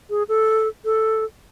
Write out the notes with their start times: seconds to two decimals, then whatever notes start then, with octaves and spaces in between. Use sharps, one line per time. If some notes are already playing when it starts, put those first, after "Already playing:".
0.10 G#4
0.29 A4
0.85 A4